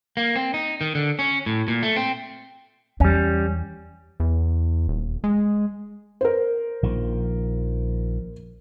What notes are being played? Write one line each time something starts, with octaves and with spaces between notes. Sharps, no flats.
A#3
C4
D#4
D#3
D3
C#4
A2
A#2
A3
C4
E2 G3 C#4
E2
D#1
G#3
A#4 C5
A#1 D#3 F3